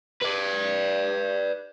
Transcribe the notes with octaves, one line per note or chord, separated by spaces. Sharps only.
B4 D5